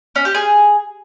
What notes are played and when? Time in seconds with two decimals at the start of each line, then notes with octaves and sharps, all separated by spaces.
0.16 C#4
0.25 G4
0.35 G#4